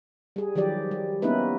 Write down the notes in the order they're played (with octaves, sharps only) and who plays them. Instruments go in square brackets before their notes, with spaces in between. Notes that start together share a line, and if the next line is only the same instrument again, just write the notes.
[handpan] G3 G#4
D#3 F3 F#3 G4 D5
G3
A#3 B3 C#4 D#4 E4 B4